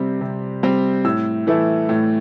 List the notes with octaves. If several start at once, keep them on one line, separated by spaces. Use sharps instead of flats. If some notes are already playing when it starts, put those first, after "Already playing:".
Already playing: C3 G3 C4
C3
G3 C4
A2 E6
E3 A3 E4
A2